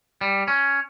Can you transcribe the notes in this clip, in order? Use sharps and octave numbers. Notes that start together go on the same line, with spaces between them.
G3
C#4